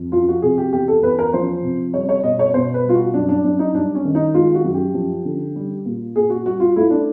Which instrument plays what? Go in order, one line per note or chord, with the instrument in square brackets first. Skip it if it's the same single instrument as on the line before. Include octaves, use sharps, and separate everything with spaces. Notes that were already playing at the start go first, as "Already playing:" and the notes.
Already playing: [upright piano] F2
F3 F4
F#4
C3 G#4
G4
E2 G4
A4
E2 B4
A#4
F3 C5
C3
G3 C#5
C#5
B2 D#5
C#5
B2 C5
B4
G3 F4
F#4
F#2 D4
D4
F#2 D4
D#4
G3 D4
C#4
D#3
D#4
G#3 F4
F#4
F#2
G4
F3
D3
G3
A#2
A#2 G#4
F#4
G3 F#4
F4
A3 E4
D4